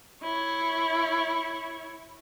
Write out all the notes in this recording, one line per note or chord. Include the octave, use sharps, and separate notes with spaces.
E4 C#5